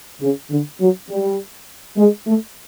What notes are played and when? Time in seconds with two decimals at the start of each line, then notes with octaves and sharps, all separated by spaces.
0.21 C#3
0.50 D3
0.81 F#3
1.10 G3
1.97 G#3
2.26 A3